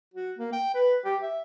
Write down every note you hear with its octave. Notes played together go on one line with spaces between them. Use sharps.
F#4
A#3
G5
B4
G4
E5